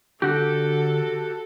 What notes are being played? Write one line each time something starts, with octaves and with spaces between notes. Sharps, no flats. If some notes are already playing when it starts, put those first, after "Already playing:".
D3 F#4 G4 A4